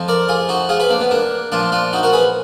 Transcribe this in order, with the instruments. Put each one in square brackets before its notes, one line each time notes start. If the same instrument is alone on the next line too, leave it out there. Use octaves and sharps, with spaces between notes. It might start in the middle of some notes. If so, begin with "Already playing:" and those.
Already playing: [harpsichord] F2 F3
A#4 D5
F4 G#4
D#4 F#4
F4 G#4
G#4 B4
A#3 D4
B3
A#3 D4
A#2 F3 D4 F4
D4 F4
D#4 F#4
F#4 A#4
G#4 B4